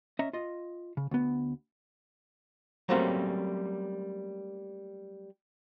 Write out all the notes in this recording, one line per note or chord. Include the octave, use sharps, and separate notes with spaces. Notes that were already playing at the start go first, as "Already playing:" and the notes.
C#4 D#5 E5 A#5
F4 D#5
C#3
D2 B3
F#3 G3 A3 A#3 C4 C#4